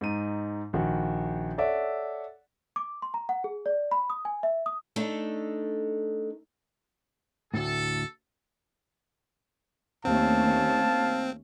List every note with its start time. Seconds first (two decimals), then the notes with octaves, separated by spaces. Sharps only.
0.01 G#2 D#4 D#7
0.73 A#1 D#3 F#4
1.58 A4 C#5 D5 E5 F#5
2.76 D6
3.02 C6
3.14 A#5
3.29 F#5
3.44 G#4
3.66 D5
3.91 B5
4.10 D#6
4.25 G#5
4.43 E5
4.66 D#6
4.96 A3 D4 D#4 A4
7.54 D2 A2 A4
10.05 D#2 A3 C4 C#4 F5 A5